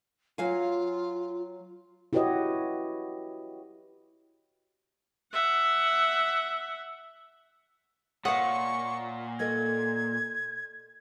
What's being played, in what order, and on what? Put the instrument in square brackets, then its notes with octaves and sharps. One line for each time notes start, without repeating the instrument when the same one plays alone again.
[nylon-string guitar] F#3 F5 G#5 [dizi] F4
[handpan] E4 F#4 G4 B4 C#5 D#5
[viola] E5 F#5
[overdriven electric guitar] A#2 [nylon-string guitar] C#5 D#5 F5 [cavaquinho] F#5 D#6 [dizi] C#6
[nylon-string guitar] A4 A#4 D#5 [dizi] G#6